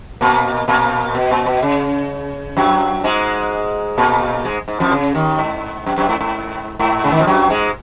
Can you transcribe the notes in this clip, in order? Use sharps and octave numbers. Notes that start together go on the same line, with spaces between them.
A#2 A#3
A#2 A#3
B2
A#2
B2
C#3
F#2 F#3
G#2 G#3
A#2 A#3
G#2 G#3
G#2
F2 F3
C#3
D#2 D#3
G#2
F#2
F#2
G#2
G#2
G#2
C#3
D#3
F3
F#2 F#3
G#2 G#3